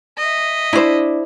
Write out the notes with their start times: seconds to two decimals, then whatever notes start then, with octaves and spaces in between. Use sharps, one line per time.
0.17 D#5 E5
0.73 D4 E4 C5